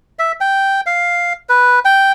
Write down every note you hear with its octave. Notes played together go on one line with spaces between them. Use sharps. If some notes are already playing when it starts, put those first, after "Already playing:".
E5
G5
F5
B4
G5